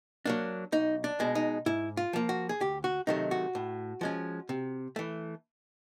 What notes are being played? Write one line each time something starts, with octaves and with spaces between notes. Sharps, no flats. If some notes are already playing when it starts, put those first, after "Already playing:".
F#3 A#3 D4
B1 D#4
D4
B2 G#3
D#4
G#2 E4
F4
F3 A#3
F#4
G#4
D2 G4
F#4
C3 D#3 F#3 A3 D#4
F#4
A2
F3 G#3 C#4
C3
E3 A3